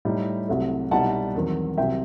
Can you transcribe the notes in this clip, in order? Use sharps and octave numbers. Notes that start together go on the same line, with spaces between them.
A2 G3 D#4
C2 C3 F#3 A3
C2 B2 G3 D#4 F#5 A5
E2 D#3 F#3 C4
C2 C3 F#3 E5 G5